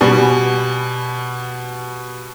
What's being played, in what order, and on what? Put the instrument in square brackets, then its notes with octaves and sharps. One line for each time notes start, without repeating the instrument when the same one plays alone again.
[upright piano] B2 G3 G#5